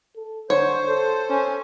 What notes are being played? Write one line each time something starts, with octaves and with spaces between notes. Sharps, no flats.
A4
D3 C5 C#5
A4
C#4